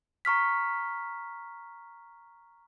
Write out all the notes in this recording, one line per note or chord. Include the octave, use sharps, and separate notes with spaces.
A#5 C#6 F6 B6